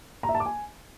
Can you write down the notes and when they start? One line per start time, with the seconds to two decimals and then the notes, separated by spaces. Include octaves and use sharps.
0.23 A#5
0.29 E5
0.35 A5
0.40 D6
0.46 G#5